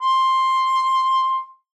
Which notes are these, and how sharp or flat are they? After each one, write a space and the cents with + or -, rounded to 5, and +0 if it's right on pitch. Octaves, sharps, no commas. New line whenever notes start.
C6 +10